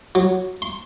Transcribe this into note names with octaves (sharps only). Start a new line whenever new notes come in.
F#3
C6